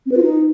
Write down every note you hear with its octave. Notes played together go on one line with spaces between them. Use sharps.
C4
B4
F4
D#4